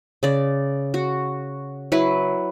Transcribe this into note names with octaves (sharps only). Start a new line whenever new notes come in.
C#3 D5
F#4
F#3 E4 B4